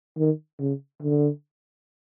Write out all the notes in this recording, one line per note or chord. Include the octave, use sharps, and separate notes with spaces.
D#3
C#3
D3